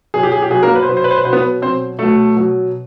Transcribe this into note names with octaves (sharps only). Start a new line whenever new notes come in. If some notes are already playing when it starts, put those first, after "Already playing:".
B2 F#3 G#4
G4
G#4
G4
B2 F#3 G#4
A#3 A#4
B4
C5
B2 F#3 B4
C5
B4
C5
B4
B2 F#3 C5
B3 B4
B2 F#3 C4 C5
B2 F#3 A3 A4
B2 F#3